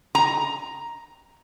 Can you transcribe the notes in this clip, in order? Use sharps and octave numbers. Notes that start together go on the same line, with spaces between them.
A#5